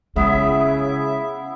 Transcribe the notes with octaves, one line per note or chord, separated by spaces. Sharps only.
C#3 G#3 B3 E4 G#4 E5